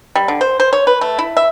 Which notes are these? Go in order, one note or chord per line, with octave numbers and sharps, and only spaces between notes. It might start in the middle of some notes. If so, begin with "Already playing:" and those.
G3
D3
C5
C5
C#5
B4
A3
E4
E5